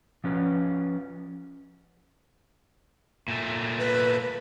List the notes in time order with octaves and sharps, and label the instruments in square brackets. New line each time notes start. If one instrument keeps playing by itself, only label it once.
[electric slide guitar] F3 C#4 B4
[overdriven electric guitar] A#2 A3
[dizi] B4